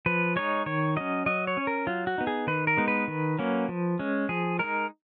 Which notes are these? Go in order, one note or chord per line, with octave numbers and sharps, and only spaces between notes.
F3 B4
G#3 D#4 C#5
D#3 C#5
F#3 C#4 D#5
F#3 D#5
C#5
C#4
A#4
F#3 F4
F#4
B3 D#4
G#4
D#3 B4
A#4
G#3 B3 D#4
B4
D#3
F#3 A#3 C#4
F3
G#3 C#4
F3 G#4
G#3 D#4 A#4